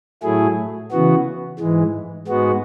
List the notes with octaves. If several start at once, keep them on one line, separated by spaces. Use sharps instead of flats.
A2 F#3 A3 E4 G#4
C#3 E3 B3 F#4
G#2 E3 G#3
G#2 G#3 B3 F#4